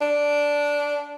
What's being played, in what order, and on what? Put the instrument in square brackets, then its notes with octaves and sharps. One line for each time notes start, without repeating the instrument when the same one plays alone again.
[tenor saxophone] D4